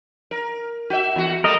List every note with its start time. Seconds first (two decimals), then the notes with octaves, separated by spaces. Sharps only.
0.31 A#4
0.90 F#4 E5
1.16 E2 F#4
1.44 G3 A3 A#3 A#4 D#5